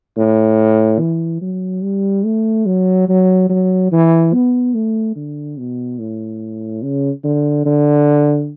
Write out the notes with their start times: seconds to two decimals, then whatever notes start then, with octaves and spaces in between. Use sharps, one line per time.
0.17 A2
1.00 E3
1.41 F#3
1.83 G3
2.25 A3
2.66 F#3
3.09 F#3
3.49 F#3
3.92 E3
4.34 B3
4.75 A3
5.16 D3
5.58 B2
5.99 A2
6.83 C#3
7.24 D3
7.66 D3